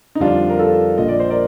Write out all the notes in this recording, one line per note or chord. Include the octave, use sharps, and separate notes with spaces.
D#4
F2 D3 G3 D4 F4
A#4
F4 A4
A#1 A#2 F3 D#5
D5
C5
A#4 D5